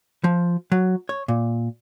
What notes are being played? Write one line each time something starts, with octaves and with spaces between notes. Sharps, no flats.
F3
F#3
C#5
A#2